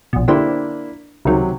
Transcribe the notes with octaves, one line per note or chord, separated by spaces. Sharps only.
A#1 B2
D3 A#3 D4 E4 G4 C5
C#2 C3 D#3 F#3